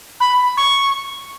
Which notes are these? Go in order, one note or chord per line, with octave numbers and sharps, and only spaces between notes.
B5
C#6